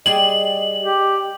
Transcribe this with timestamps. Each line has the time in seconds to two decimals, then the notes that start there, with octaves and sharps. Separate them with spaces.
0.06 G3 G#4 D#5 F#7
0.79 G4